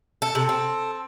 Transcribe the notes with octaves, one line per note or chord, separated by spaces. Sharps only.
A4
C3 A4
C4